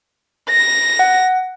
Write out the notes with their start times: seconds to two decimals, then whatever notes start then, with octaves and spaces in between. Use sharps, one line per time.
0.51 A#6
0.99 F#5